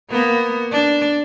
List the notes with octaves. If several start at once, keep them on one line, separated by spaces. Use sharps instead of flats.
A#3 B3
D4